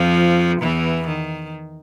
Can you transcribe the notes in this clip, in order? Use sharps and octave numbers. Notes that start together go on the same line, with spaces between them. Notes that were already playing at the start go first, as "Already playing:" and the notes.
Already playing: F2 F3
E2 E3
D#3